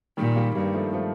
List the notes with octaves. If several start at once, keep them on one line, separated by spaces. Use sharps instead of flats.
A#2 D#3 G3
G3 A#3
G2 G3 A#3
F3 A3
F3 A3